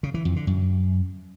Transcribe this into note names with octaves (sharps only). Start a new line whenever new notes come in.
C#3
E3
F2
D3
F#2